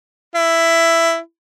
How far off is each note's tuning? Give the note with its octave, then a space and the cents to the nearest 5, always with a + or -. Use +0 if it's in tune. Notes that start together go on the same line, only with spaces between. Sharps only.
E4 +10